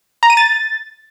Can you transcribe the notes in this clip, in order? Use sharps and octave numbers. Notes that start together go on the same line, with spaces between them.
A#5
D#7
A6